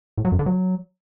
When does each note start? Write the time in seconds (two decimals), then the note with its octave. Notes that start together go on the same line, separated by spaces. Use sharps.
0.18 A2
0.25 F#3
0.32 F#2
0.39 D3
0.46 F#3